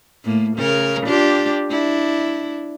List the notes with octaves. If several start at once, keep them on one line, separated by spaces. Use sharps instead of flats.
A2 A#3
C#3 A#4
D4 F4 G4
D4 E4